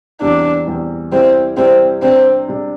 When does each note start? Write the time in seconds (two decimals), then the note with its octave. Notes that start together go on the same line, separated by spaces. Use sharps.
0.21 E2 C3 E3 G3 D4
0.67 E2 C3 E3 G3
1.12 C3 G3 C4 E4
1.57 C3 G3 C4 E4
2.02 C3 G3 C4 D4
2.48 C3 G3 D4